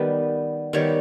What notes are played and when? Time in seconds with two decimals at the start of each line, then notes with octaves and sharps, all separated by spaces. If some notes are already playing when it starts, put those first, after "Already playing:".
Already playing: D#3 G3 B3
0.73 D#3 G3 B3 C#5